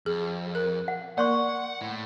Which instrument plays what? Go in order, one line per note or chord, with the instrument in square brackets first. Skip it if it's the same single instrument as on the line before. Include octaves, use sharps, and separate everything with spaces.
[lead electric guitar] F2 [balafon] G#4
[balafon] A#4
[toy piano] F#5
[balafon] A#3 A#4 [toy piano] D5 C6 C#6 [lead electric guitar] F#5
[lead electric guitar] A2